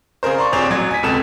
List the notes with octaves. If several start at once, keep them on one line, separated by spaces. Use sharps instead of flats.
C#3 G#4 A#4 C5
D5 A#5 C6 C#6
D#1 C4 G#4 C#5 D5 F7
A1 F#3 G#6
G#5 B6
D1 C#2 C3 A4 E7